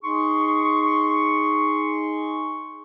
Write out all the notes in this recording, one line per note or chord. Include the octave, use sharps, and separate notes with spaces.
D#4 G#4 C6 C#6